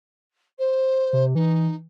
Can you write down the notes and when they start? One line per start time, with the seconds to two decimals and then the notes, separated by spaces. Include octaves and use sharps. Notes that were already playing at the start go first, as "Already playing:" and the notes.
0.58 C5
1.13 C3
1.35 E3 D#4